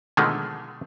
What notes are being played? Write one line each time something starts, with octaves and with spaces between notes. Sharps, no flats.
B2 D3 D#3 F3 G#3 A3